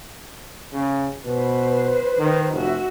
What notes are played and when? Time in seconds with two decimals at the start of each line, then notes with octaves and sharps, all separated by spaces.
0.73 C#3
1.26 B2 B4 C5
2.19 D#3
2.53 F1 F#4 E5